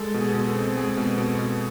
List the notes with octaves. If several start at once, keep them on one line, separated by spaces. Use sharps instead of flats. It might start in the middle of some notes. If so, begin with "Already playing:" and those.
Already playing: G#3 A4
B2
G#4
B2
A4
C4
G#3 G#4
B2
B2
B2